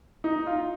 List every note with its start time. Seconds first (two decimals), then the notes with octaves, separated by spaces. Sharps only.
0.24 D#4
0.47 F4